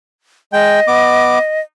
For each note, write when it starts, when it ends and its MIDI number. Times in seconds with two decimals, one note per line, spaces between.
0.53 0.80 56
0.53 1.60 75
0.53 0.80 79
0.88 1.39 59
0.88 1.39 86